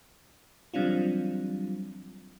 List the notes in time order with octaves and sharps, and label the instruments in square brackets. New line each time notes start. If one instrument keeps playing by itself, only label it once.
[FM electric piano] E3 F#3 G3 C4 D4 F4